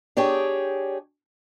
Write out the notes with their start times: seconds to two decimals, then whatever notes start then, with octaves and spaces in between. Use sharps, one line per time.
0.17 D4 G4 G#4 C#5